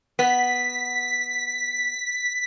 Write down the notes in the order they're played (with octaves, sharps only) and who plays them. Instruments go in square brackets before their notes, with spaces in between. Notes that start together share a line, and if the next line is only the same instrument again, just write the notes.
[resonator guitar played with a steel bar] B3 [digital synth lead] B6